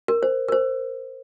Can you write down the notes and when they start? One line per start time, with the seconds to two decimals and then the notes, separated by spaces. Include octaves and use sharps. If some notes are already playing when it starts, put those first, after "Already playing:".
0.08 A#4
0.23 C5
0.48 A#4
0.52 C5